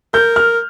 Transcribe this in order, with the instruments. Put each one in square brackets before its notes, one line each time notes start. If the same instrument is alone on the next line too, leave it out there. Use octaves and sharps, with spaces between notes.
[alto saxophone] A#4 [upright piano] G6
[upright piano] F6